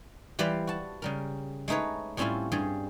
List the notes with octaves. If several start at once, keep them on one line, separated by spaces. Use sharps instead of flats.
E3 G3 B4 C5 D5 F5
F#4 A5
C#3 G3 A#4
G#3 A3 D#4 B4 C#5
A2 G3 C4 C#4 E4 F4
G2 G3 G#4